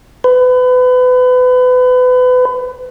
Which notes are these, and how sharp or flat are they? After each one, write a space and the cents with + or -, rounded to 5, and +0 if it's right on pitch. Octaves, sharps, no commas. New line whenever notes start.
B4 +30